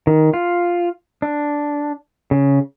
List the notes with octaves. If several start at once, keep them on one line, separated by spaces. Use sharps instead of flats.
D#3
F4
D4
C#3